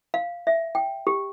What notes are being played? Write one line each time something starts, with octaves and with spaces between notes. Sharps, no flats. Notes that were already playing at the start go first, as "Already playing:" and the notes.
F5
E5
G5
G4